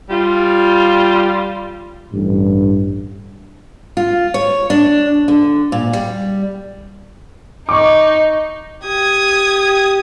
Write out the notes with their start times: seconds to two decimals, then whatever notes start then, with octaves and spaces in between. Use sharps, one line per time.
0.10 G3 F4
2.12 A1 G2
3.97 F4
4.34 C#5
4.70 D4
5.28 D3
5.72 A#2
5.93 G3
7.69 D#4 C#6 D6
8.86 G4 D#6 G#6